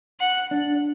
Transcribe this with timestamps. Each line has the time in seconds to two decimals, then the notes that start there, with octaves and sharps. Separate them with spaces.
0.20 F#5
0.51 D4